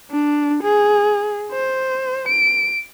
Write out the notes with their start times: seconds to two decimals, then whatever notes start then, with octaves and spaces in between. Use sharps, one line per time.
0.11 D4
0.63 G#4
1.52 C5
2.28 D7